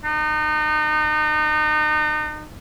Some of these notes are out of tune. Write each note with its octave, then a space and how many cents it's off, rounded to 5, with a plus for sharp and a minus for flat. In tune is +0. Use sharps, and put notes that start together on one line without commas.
D#4 -35